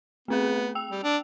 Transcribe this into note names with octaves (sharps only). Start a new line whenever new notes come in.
A3 B3 C4 G#4
G5 E6 F7
G3
D4